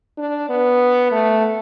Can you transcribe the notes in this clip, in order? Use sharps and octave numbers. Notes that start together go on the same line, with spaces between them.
D4
B3
A3